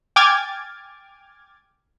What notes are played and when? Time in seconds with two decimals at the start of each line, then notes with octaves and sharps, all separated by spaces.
0.16 G5 G#5 D6 F6 G#6 A6